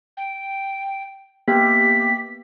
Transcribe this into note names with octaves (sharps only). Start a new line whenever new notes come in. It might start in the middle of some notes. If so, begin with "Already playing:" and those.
G5
A#3 B3 G4 B6